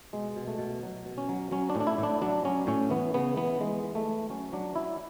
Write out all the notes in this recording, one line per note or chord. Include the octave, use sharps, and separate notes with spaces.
B2 G#3
B2
A3
B2
F#3
B2
C#4
F#3
F#3 C#4
D4
A2
D4
E4
A2
D4
F#3 D4
F#3 C#4
A2 C#4
E3 B3
C#3 B3
E3 B3
E3 G#3
E3
A3
E3
F#3 C#4
F#3 D4
F#3 E4